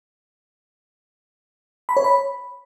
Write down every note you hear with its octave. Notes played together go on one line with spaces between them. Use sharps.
B5
C#5
B5